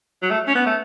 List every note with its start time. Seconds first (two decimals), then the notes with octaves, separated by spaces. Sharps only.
0.22 F#3
0.31 A3
0.47 C#4
0.55 B3
0.66 A3